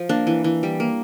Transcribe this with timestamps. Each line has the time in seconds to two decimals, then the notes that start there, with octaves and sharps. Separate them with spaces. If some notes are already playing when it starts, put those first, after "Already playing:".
Already playing: F3
0.09 A#3 D4
0.27 E3
0.44 E3
0.63 G3
0.80 A#3